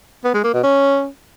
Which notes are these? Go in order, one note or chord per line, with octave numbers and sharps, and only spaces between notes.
B3
G#3
A#3
B2
C#4